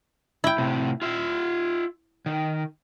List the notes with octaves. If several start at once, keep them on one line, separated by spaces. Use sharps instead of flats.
E4 G5
A2 C3
F4 E5
D#3